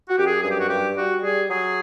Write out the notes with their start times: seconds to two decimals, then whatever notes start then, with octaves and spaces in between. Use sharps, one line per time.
0.08 F#4
0.17 F#2 G4
0.26 G#4
0.43 G2 G#4
0.51 G4
0.60 F#4
0.68 G2 G4
0.96 G3 F#4
1.22 G3 G#4
1.49 F#3 G#4